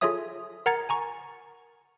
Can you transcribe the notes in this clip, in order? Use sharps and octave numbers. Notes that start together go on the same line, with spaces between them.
F4 G#4 A4 C#5 E5 D#6
A#4 F#5 A#5 G#6 A6 C#7
G#5 A#5 C#6